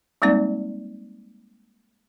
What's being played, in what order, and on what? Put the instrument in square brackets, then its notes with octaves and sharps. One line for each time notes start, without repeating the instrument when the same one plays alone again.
[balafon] G3 G#3 A#3 C4 D#4 D5